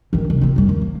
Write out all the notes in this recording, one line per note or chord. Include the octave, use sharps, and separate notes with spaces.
D#3 E3
C2
C4 F4
F#2 G3
D#2
A#3